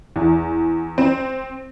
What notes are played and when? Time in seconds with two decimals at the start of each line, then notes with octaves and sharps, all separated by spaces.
0.16 E2
0.98 C4